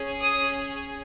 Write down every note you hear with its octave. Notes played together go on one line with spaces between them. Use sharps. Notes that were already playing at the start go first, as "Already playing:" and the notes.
Already playing: C#4 G#4
D#6